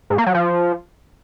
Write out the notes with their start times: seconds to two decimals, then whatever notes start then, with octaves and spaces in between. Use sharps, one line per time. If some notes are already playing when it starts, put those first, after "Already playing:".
0.10 G#2
0.18 A#3
0.26 F#3
0.34 F3